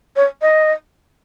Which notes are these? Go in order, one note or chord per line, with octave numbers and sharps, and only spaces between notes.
C#5
D#5